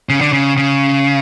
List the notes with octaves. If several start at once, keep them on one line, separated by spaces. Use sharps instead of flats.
C#3
D3
C#3
C#3